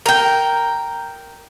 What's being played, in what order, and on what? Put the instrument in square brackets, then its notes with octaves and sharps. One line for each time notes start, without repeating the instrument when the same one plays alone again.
[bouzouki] A#4 G5